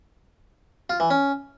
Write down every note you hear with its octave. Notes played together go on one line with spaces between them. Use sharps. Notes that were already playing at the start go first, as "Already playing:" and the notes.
F4
E3
C#4